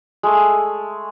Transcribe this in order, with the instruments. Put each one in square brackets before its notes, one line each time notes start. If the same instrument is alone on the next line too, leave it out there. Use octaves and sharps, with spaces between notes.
[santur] G#3 A3